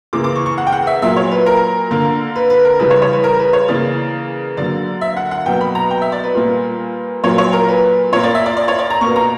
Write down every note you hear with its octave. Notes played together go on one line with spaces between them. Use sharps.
C#3 E3 A#3 D6
D6
C#6
C#6
F#5
G5
F#5
E5
A#2 F#3 A#3 E5
C#5
B4
A#4
D3 A#3
B4
B4
A#4
C#3 E3 G3 B4
C#5
C#5
B4
A#4
B4
C#5
C#3 E3 A#3 D5
D3 F#3 A#3 D5
E5
F#5
F#5
B2 F#3 A#3 G5
B5
A#5
G5
E5
D5
B4
A#2 G3 A#3
A#2 F#3 A#3 C#5
C#5
A#4
B4
A#2 A#3 C#5
D5
E5
D5
D5
C#5
D5
A#5
B2 A#3 C#6
A#5